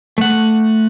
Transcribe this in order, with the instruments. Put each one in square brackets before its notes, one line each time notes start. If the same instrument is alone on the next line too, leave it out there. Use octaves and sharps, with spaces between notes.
[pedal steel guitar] A3 F#5